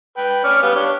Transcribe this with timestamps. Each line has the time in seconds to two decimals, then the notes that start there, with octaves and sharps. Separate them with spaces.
0.17 B4 G5
0.44 C#4 D5 F6
0.63 G3 B3 F5
0.75 D4 G4 C#5